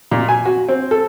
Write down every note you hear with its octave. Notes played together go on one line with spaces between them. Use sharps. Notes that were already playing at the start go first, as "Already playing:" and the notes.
A#2
G#5
F#4
C4
A4